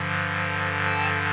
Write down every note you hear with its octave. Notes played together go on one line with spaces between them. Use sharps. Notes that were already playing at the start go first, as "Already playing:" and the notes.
Already playing: G2 D3 F3
G5 A5